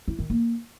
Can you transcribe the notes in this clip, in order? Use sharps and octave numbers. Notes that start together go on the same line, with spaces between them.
E4
D#3
A#3